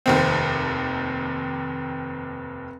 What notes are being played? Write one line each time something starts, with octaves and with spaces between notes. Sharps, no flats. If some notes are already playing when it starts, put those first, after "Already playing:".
F1 D#2 C4